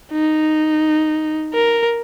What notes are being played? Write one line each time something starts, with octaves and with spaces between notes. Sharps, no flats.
D#4
A#4